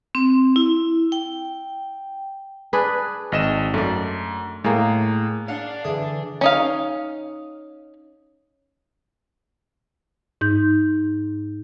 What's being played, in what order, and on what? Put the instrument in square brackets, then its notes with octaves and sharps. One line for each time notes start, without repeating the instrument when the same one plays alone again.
[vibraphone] C4
E4
G5
[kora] D4 G#4 B4
[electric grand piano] G#1 D#5 E7
[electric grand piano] F#2 [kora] A3 D5
[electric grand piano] A2 [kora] G#3 A#3
[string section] D4 [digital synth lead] F5 [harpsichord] F#5
[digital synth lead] D3 [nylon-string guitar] E3 E5 [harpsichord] G#4
[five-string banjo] C#4 D#4 F5
[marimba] G#2 D#4 G6